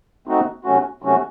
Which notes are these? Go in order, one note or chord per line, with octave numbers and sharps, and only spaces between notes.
A3 C4 D#4 F#4
C3 F#3 A3 C#4 F#4
C3 F#3 A3 C#4 F#4